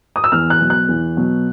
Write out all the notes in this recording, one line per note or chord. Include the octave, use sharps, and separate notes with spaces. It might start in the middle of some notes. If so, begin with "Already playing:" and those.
D#6
E6
E2 F6
F#6
B2 F#3
F#6
E2
B2 F#3